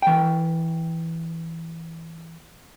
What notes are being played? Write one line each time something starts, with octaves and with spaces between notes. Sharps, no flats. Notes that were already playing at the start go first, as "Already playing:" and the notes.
E3 G5